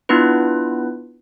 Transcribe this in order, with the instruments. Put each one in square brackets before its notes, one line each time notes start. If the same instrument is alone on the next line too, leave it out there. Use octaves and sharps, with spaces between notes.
[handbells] B3 D4 E4 F4 B4